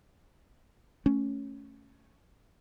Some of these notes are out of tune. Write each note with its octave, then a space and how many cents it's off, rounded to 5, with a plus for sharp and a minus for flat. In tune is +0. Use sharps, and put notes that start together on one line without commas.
A3 +0 C#4 +0